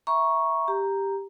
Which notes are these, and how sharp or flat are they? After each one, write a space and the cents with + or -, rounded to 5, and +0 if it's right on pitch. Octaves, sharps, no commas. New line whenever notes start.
E5 +0 A#5 +25 C#6 -5
G4 +5 A#5 +0